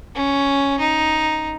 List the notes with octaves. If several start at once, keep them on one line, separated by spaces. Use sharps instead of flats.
C#4
D#4